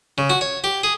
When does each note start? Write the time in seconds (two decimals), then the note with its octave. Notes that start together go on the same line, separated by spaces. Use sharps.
0.18 C#3
0.30 F#4
0.41 C#5
0.64 G4
0.83 G#4